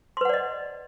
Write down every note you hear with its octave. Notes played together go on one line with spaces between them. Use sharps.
B4 D5 D#5 F#5 C6